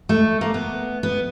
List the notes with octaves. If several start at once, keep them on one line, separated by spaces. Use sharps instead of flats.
A3
A#3
B3
B3